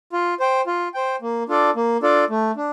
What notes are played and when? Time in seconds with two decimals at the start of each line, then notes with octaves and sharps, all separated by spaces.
0.13 F4
0.40 C5 G5
0.67 F4
0.94 C5 G5
1.22 A#3
1.49 D4 F4 A4 D5
1.76 A#3
2.02 D4 F4 A4 D5
2.30 A3
2.56 D4